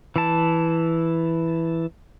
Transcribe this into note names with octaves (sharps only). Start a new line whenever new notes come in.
E3 E4 A5